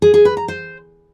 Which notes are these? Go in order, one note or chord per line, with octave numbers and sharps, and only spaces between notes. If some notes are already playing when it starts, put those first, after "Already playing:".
G#4
G#4
B4
A#5
C5